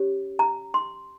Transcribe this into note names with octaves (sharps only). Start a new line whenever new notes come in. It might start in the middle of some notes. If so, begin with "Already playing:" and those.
Already playing: C#4 G4 C#5
A#5
C6